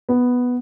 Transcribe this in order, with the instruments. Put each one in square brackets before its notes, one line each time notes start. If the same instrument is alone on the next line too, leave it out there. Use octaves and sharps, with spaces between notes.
[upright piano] B3